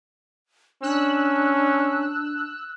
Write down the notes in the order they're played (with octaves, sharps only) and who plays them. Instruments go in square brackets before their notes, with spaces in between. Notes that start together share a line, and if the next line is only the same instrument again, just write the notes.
[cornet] C#4 [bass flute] D4 [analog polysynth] E6 F#6